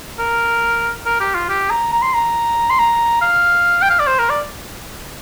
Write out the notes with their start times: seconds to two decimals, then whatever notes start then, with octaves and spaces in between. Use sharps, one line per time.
0.19 A#4
1.06 A#4
1.20 G4
1.34 F4
1.49 G4
1.70 A#5
1.93 A#5
2.02 C6
2.14 A#5
2.70 C6
2.79 A#5
3.22 F5
3.82 G5
3.90 F5
3.99 D5
4.07 C5
4.19 A#4
4.30 D5